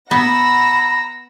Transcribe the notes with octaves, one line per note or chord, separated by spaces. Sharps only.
B3 F#5 A#5 B5 E6 A#6